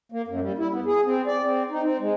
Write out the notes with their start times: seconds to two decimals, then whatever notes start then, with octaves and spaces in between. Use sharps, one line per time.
0.12 A#3
0.27 F#2
0.41 G3
0.58 E4
0.72 B3
0.85 G#4
1.05 C4
1.27 D5
1.44 C4
1.70 D#4
1.82 C4
2.00 G#3